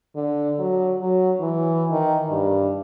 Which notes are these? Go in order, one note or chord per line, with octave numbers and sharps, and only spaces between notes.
D3
F#3
F#3
E3
D#3
G2